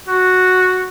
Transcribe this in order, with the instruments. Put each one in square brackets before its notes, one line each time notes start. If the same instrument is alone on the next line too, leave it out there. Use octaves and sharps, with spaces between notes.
[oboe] F#4